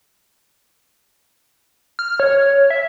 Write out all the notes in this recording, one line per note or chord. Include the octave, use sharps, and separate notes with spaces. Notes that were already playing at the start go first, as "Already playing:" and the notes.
F6
C#5
E5